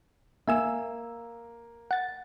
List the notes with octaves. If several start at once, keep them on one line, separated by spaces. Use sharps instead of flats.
A#3 E5 G#5 E6
F#5 A6